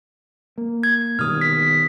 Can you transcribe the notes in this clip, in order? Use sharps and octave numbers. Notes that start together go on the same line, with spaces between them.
A#3
G#6
B2 D#3 G3 D#6 F6
B6